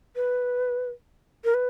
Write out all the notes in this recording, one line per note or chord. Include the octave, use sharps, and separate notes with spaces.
B4
A#4
B4